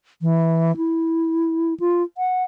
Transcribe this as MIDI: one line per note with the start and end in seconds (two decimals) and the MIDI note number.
0.22 0.76 52
0.77 1.74 64
1.80 2.03 65
2.18 2.44 78